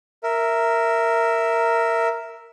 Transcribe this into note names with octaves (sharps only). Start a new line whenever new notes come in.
A#4 E5